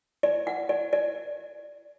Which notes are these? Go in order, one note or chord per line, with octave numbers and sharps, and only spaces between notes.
D5
F#5
D5
D5